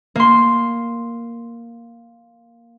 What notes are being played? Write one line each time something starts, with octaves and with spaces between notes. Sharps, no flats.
A#3 C6